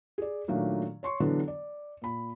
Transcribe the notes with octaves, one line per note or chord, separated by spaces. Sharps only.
G#4 D5
A#2 D#3 F#3 A3 A#3 D4
C#5 C6 C#6
D3 E3 F#3 B3 D4
D5
A#2 B5